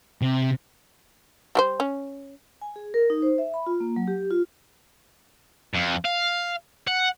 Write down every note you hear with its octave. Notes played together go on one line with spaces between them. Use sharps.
C3
G3 G4 C5
C#4
G#5
G#4
A#4
D#4
C5
E5
B5
F4
A#3
F#3
G4
F4
F2
F5
F#5